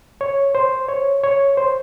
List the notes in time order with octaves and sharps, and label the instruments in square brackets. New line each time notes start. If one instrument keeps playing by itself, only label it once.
[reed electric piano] C#5
C5
C#5
C#5
C5